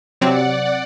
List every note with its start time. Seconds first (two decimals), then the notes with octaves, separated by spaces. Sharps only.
0.21 C3 F#3 C4 D5 F#5